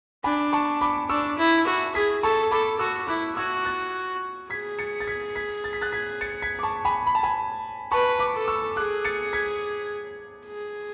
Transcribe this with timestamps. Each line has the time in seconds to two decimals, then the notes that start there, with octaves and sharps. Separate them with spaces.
0.24 D4 G#5 B5
0.53 A5 C#6
0.81 B5 D6
1.09 D4 C#6 E6
1.38 E4
1.67 F#4
1.95 G#4 G#6 B6
2.23 A4 A5 C#6
2.51 A4 B5 D6
2.79 F#4 C#6 E6
3.08 E4 D6 F#6
3.36 F#4 E6 G#6
3.65 F#6 A6
4.50 G#4 G#6 B6
4.79 A6 C#7
5.00 A6
5.07 G#6 B6
5.35 G#6 B6
5.64 A6
5.73 B6
5.81 F#6 A6
5.92 G#6 B6
6.21 A6 C#7
6.42 G#6 B6
6.59 D6
6.63 A5 C#6
6.85 G#5 B5
7.07 B5
7.15 A5
7.23 G#5 B5
7.92 B4 A5 C#6
8.19 B5 D6
8.34 A4
8.48 C#6 E6
8.76 G#4 D6 F#6
9.05 A6 C#7
9.33 G#6 B6
10.46 G#4